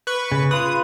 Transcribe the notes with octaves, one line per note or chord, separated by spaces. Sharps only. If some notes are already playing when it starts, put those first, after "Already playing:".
B4 C#6
C#3
F4 B4 D#6